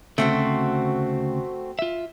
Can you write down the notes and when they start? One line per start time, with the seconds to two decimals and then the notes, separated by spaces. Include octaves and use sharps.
0.18 D2 C#3 A3 C4 F#4
1.79 F4 E5